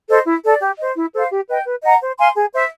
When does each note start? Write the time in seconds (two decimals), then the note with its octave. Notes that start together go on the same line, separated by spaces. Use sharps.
0.08 A4 C5 D#5
0.25 E4
0.43 A4 D5
0.60 G4
0.78 C5 D#5
0.95 E4
1.13 A4 C5 F5
1.30 G4
1.48 B4 D#5 G5
1.65 B4
1.83 D#5 F#5 A#5
2.01 C5
2.18 F5 G#5 C6
2.35 G#4
2.53 C5 E5